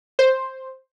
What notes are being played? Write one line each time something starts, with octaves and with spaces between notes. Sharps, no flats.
C5